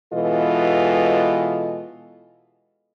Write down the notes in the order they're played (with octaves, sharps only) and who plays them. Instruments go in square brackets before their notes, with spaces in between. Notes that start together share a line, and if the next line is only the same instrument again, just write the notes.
[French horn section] B2 E3 G#3 F4 A4 D#5